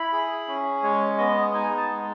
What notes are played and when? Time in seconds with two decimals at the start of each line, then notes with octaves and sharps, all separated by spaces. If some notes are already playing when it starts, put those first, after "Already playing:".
Already playing: E4 B5
0.13 G#4
0.48 C#4
0.83 G#3 C#5
1.18 B3 D#5
1.54 D#4 G#5
1.78 A5
1.89 G#3